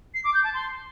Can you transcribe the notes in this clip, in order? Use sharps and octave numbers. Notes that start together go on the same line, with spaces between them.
C7
D6
G6
A5
C6